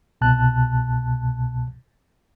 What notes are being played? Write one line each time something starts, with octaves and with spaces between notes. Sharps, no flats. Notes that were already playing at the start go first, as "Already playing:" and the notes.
C2 B2 A5 F#6